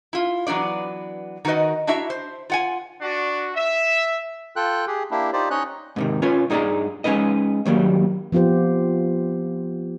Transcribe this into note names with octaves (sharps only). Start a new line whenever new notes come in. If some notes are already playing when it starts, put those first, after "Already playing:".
E4 F4
E3 F#3 B3 D4 D5
D#3 F#4 A#4 B4 D#5
D4 E4 F#4 E5 A#5
C5
F4 F#5 G#5
D4 F#4
E5
F4 A4 G5 F#6
G4 G#4
A#3 D4 E4 G4
D#4 F4 G4 C5 D5
C#4 D#4 C#5 D#5 F#6
G#2 C3 D#3
C#4 F4 B4 C#5
G2 D#4 G#4 D5 D#5 A#5
G#3 C#4 D#4 B4 D#5
D#2 F#3 G3 A#3
F3 B3 F4 G4 C5